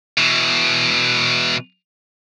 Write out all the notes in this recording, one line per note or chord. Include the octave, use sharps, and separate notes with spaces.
B2 E3